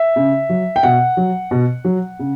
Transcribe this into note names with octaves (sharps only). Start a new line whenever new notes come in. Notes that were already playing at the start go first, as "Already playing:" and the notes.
Already playing: E5
C#3
F#3
G5
B2 F#5
F#3
B2
F#3
C#3